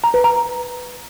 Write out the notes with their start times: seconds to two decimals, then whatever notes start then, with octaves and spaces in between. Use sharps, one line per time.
0.04 A#5
0.14 B4
0.24 A#5